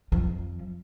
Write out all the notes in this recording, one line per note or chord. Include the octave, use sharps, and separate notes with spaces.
F2 F3